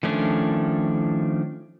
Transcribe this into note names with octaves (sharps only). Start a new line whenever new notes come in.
D#3 F3 A3 C#4 D4